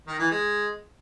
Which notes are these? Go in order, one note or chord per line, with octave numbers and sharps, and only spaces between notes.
D#3
E3
G#3